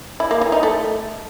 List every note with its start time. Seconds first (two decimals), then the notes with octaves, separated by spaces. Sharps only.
0.20 E4
0.31 A#3
0.41 E3
0.52 D#4
0.63 A3